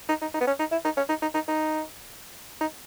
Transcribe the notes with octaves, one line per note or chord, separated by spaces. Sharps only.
D#4
D#4
D#4
B3
C#4
D#4
E4
D#4
C#4
D#4
D#4
D#4
D#4
D#4